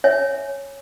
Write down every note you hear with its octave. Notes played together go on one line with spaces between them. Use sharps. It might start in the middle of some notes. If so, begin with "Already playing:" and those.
C#5 E5 G#5